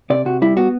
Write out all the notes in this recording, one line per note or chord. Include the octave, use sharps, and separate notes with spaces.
C3 D5
C3 F#4
G3 E4
B3 F#4